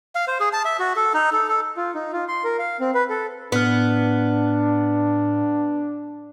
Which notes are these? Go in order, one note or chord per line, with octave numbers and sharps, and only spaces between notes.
F5
C5
G#4
A5
E5
F#4
A4
D#4
A4
A4
F4
D#4
F4
C6
A#4
F5
C4
B4
A4
A2 B3 D4 F6